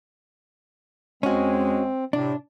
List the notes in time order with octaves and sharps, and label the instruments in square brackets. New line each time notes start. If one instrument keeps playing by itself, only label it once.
[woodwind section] E2 G#3 [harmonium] C4 [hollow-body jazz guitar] C#4 F#4
[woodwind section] A2 C3 [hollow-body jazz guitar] D4